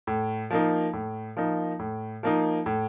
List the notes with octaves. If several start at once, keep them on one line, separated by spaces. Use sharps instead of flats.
A2
F3 A#3 D#4
A2
F3 A#3 D#4
A2
F3 A#3 D#4
A2